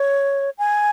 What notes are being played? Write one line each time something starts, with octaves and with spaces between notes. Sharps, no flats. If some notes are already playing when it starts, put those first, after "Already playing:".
Already playing: C#5
G#5